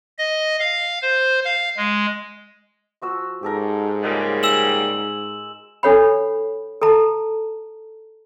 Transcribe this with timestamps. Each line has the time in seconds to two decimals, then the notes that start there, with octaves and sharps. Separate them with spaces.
0.18 D#5
0.59 F5
1.02 C5
1.44 F5
1.77 G#3
3.02 F3 F#4 E6
3.43 G#2 G4 A4 A#4
4.03 A#2 C#3 G3 G#3
4.43 G#5 E6 E7 F#7
5.83 D4 A4 C#5 F#5 B5
6.82 A4 A5 A#5